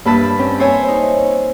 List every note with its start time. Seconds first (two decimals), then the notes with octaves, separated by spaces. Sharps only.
0.05 G2 A#3 B4 E5 A5
0.39 C4 C#4
0.60 C5 C#5 E5 G#5
0.88 D#4